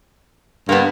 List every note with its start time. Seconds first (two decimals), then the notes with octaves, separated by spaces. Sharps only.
0.69 G2 A#3 B3